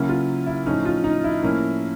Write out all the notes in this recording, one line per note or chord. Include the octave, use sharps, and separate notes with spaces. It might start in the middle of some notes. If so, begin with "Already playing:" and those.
Already playing: C#3 F#3 A#3 C#4 E4
F4
E4
A2 F3 A3 C#4 D#4
F4
D#4
E4
A2 F3 A#3 C#4